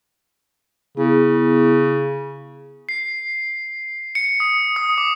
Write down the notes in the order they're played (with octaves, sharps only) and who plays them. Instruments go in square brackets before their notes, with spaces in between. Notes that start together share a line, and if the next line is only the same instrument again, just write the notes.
[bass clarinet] C#3 [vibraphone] B3 E4 G#4
[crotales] C7
C#7
D#6
D#6
D6